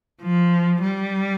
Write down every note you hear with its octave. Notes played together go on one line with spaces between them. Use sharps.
F3
G3